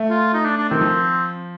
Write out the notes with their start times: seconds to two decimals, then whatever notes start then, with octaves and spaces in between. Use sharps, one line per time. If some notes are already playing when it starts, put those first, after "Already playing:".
Already playing: A3
0.10 F4
0.34 D#4
0.45 D4
0.57 D4
0.69 D#3 C4
0.81 F3